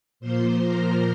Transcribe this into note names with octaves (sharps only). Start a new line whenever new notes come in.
A#2 F3 A#3 C5 C6
A#4 A#5